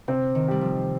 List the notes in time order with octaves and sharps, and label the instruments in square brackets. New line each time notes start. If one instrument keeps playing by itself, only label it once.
[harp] C3 [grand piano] C4
[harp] D#3
[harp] G3 [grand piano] G4
[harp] F3